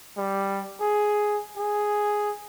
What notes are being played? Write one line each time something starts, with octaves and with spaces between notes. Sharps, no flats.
G3
G#4
G#4